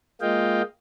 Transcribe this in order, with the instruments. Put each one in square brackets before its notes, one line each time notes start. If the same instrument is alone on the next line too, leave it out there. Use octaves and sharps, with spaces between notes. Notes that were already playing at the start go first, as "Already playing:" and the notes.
[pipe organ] G#3 A#3 F4 D#5 F5 G5